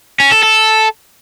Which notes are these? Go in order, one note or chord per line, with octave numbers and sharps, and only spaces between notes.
C#4
A4
A4